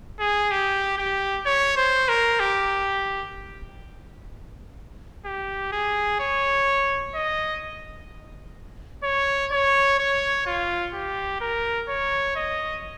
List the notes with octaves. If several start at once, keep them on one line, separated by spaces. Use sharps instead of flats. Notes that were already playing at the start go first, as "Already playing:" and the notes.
G#4
G4
G4
C#5
C5
A#4
G4
G4
G#4
C#5
D#5
C#5
C#5
C#5
F4
G4
A#4
C#5
D#5